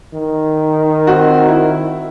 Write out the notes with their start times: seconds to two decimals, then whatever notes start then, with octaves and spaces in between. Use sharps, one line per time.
0.14 D#3
1.07 C4 F#4
1.48 E4